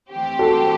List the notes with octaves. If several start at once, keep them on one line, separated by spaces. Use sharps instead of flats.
E3 A3 C4 G4 C5
F#4 A4